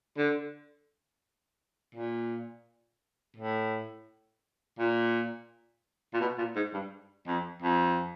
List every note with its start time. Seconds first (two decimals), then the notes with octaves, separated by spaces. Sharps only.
0.18 D3
1.95 A#2
3.36 A2
4.79 A#2
6.14 A#2
6.20 B2
6.38 A#2
6.56 G#2
6.73 G2
7.27 F2
7.62 F2